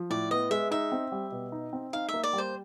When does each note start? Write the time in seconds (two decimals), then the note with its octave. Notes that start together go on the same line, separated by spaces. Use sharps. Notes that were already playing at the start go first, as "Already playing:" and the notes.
Already playing: F3
0.10 A2 D5
0.31 B3 D#5
0.51 G#3 E5
0.71 D#4 E5
0.92 C4
1.12 G3
1.32 B2
1.52 D#4
1.73 C4
1.93 D#4 F5
2.09 A#3 E5
2.23 D5
2.33 G3
2.38 C5